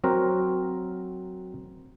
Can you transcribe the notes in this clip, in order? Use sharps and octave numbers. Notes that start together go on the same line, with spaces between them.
F#3 C4 F#4 A#4